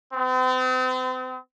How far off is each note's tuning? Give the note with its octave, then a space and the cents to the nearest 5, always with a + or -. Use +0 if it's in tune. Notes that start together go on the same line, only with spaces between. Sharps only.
C4 -40